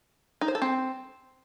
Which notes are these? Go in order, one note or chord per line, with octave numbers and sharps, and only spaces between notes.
D#4
C5
A4
C4